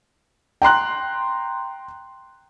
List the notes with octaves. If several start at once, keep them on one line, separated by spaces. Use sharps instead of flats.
G5 A#5 C6 F#6